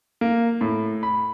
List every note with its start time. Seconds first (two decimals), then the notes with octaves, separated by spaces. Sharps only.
0.21 A#3
0.61 A2
1.03 B5